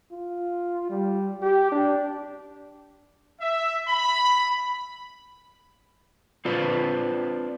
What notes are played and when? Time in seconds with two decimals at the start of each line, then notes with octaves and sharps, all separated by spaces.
0.12 F4
0.90 G3
1.43 G4
1.72 D4
3.41 E5
3.87 B5
6.45 C4 D4 F4 B4 C5